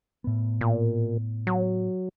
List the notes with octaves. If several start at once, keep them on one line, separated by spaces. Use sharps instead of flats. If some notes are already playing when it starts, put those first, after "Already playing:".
A2 B3
A#2
F#3